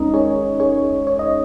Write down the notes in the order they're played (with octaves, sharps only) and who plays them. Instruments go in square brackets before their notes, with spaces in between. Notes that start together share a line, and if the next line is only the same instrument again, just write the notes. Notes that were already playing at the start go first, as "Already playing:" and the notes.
Already playing: [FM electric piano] D#2 G#3 C#4 D#4 A#4 D#5
G#4 C#5
G#4 C#5
C#5
D#5